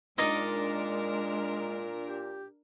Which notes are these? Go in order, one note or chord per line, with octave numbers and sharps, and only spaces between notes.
A#2 G#3 D4 D#4 A#4 D5 D#5
G4